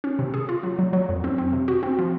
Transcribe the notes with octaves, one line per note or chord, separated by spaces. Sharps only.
C#4
C3
G#4
F4
F#3
F#3
F#3
F2
C4
C4
C3
F#4
C4
F3